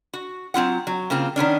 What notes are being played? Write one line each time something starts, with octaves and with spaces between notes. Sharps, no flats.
F#4
F#3 C4 F4 F#5
F#3
C#3 A#3 C4 F4
D#3 B3 C#4 D4